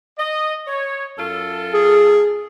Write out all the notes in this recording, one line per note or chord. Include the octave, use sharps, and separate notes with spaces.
D#5
C#5
F#2 F4 A4
G#4